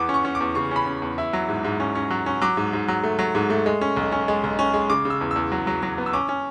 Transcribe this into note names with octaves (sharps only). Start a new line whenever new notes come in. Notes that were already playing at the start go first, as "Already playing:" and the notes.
Already playing: E2 B3 D6
C#4
C#6
C#4
D6
E2
C#3 C#6
C#4 B5
C#4
E2
E4
F#3
G#2
G#2
C#4
C#4
F#3
C#4
F#3 D6
G#2
G#2
F#3
A3
F#3
G#2
A3
G#3
C#4
B1
C#4
G#3
B1
C#4
G#3
C#3 D6
C#3
E6
E2
E2 E6
F#3
F#3
F#3
B3
E6
C#4 D6
C#4